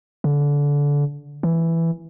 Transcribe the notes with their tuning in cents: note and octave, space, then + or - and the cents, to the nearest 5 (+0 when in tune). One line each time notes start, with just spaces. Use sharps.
D3 -25
E3 +5